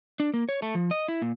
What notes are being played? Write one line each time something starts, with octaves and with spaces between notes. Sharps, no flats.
D4
A#3
C#5
A3
F3
D#5
E4
A#2